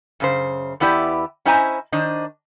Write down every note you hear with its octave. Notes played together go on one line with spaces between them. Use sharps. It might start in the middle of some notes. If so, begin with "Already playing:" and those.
F#2 C#3 C5
E2 B3 E4 G4 D5
C#4 E4 C5 D#5 G#5 A#5
D#3 D4 C5 D#5